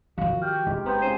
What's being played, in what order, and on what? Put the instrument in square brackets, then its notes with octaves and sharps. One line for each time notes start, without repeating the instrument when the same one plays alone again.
[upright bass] D#3 F3 [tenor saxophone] F#4 [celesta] F5
[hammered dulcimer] G4 [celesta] F6 G6
[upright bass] F#1 [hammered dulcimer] G#2 G4
[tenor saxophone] B3 [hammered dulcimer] C4 [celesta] A#5 G6
[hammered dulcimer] C#4 F4 G#4 [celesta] D#4 C7 D#7 [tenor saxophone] C5